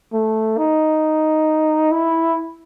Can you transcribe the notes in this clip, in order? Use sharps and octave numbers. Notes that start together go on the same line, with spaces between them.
A3
D#4
E4